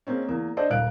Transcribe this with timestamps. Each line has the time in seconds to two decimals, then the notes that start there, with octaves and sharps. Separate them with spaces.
0.07 G#3 A#3 C4 C#4
0.28 E2 A#3
0.57 D4 A4 C5 D5 D#5
0.70 D#1 A#4 F5 F#6 D7